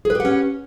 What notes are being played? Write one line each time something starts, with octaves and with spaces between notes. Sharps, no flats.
C#4 G4 G#4 B4 F#5